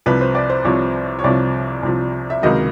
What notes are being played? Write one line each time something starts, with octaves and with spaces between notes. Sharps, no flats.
C2 C3 F3 B4
C5
D5
C5
C2 C3 F3 C#5
C#5
C2 C3 F3 D5
C2 C3 F3
E5
C#2 C3 D#3 F#3 D#5